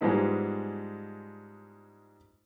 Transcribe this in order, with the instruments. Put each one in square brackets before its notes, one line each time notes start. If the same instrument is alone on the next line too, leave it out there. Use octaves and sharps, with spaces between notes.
[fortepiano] G#2 F3 G3 G#3 B3 E4